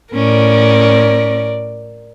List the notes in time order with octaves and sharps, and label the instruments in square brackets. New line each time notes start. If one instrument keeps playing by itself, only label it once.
[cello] A2 C#4 [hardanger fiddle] A#4 D5